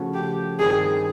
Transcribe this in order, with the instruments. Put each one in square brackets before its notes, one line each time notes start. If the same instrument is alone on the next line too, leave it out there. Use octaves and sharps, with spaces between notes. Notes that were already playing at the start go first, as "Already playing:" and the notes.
Already playing: [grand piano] C#3 F3 A3 C#4 F#4
[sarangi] G4
[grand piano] G2 D#3 G3 C4 [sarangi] G#4